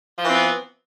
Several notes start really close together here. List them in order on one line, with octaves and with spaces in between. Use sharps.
F3 E3 C4 B3